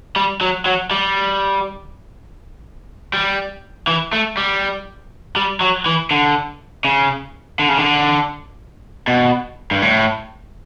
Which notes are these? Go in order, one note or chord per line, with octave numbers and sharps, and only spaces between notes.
G3
F#3
F#3
G3
G3
E3
A3
G3
G3
F#3
E3
D3
C#3
D3
C#3
D3
B2
G2
A2